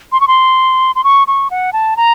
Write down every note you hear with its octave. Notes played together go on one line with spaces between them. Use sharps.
C6
C#6
C6
C6
C#6
C#6
F#5
A5
A#5